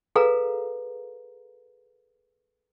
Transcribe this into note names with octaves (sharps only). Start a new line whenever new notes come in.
G#4 A4 B4 F5 A#5